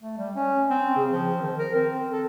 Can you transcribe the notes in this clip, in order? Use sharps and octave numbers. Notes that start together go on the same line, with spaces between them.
A3
G3
C#4
C4
C#3
F3
D#3
A#4
C4
A4